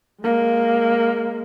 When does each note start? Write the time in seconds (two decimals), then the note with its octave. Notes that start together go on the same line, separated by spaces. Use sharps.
0.22 G#3 A#3